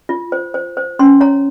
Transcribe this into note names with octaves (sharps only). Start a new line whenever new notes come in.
F4
C5
C5
C5
C#4 C6
C#5 A#5